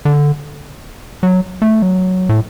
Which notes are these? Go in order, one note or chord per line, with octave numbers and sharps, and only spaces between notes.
D3
F#3
A3
F#3
A2